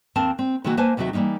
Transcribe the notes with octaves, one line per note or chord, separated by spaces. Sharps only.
D#2 C4 A#4 F5 A5
C4
C3 D#3 E3 A#3 F#4
A#3 B4 C5 G#5 A5
D#2 C3 F#3 D#4 F#4 E5
E3 G3 A3 A#3 D#4